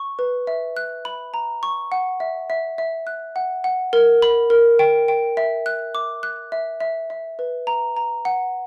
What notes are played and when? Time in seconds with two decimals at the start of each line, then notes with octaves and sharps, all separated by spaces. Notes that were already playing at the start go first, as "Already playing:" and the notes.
Already playing: C#6
0.19 B4
0.47 E5
0.77 F#6
1.05 B5
1.34 A#5
1.63 C#6
1.92 F#5
2.20 E5
2.50 E5
2.78 E5
3.07 F#6
3.36 F#5
3.64 F#5
3.93 A#4
4.22 B5
4.50 A#4
4.79 G5
5.08 G5
5.37 E5
5.66 F#6
5.95 D6
6.23 F#6
6.52 E5
6.80 E5
7.10 E5
7.39 B4
7.67 A#5
7.97 A#5
8.25 F#5